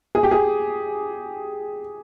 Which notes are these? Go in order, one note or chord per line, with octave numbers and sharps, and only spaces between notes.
G#4
G4
G#4